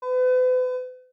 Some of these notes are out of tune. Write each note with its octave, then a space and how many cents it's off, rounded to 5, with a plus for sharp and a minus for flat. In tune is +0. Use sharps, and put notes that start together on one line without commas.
B4 +40